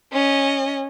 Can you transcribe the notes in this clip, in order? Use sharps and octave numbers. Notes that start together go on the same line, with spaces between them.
C#4 D#5